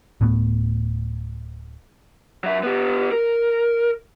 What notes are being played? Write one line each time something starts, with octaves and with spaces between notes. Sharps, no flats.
D1 A2 A3 B3
F#3 E5
B3 G4
A#4